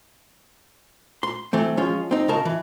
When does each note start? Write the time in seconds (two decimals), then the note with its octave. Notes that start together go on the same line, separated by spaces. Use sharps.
1.23 C6
1.53 E3 A3 C4
1.77 F3 G#3 C#4 F4
2.11 C4 D#4
2.28 C#3 G#3 A#4 A5
2.45 E3